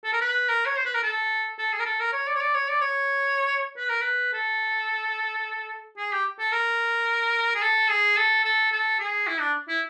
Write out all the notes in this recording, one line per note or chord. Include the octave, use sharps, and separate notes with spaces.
A4
A#4
B4
A#4
C#5
C5
B4
A#4
A4
A4
G#4
A#4
A4
A#4
C#5
D5
C#5
D5
C#5
D5
C#5
B4
A#4
B4
A4
G#4
G4
A4
A#4
G#4
A4
G#4
A4
A4
A4
G#4
E4
D4
E4